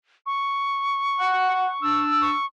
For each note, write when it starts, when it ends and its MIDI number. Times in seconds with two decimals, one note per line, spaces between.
0.26 2.04 85
1.18 1.68 78
1.82 2.32 62
1.82 2.32 88
2.21 2.46 85